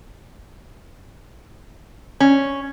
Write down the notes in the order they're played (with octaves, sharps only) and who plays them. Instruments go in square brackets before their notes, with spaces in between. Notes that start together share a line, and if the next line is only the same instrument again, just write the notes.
[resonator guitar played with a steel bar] C#4